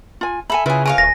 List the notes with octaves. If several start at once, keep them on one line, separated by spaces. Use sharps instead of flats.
F4 G#5
A4 E5 G#5 B5
C#3 E4 F4 G#4 B4 E5
A#4 C#5 F5 G#5
D1 A#6